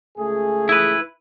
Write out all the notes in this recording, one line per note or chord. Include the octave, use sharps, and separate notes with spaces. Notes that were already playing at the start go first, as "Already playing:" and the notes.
C#2 A3 G#4
E4 B4